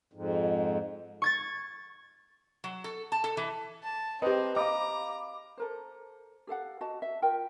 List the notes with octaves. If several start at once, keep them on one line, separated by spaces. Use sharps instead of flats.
F2 G#2
C#6 G#6 A6
F#3
A4
A5
A4
E3
A5
C4 G4 B4 D#5
D#5 F5 A#5 B5 D6
A4 A#4 C5
G4 A4 F5 F#5
F#4 D#5 A5
E5
F4 A#4 G5